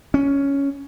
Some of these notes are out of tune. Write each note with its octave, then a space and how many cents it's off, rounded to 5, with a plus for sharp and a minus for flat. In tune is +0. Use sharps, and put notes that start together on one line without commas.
C#4 +5